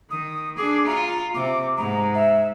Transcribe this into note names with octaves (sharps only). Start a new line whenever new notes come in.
D#3 D#6
D4 G#4 D6
F4 A#5
C3 D6
G#2 A#5
E5